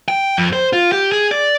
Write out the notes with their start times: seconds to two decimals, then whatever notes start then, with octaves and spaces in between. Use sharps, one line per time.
0.08 G5
0.38 F2
0.53 C5
0.73 F4
0.92 G4
1.12 G#4
1.31 D5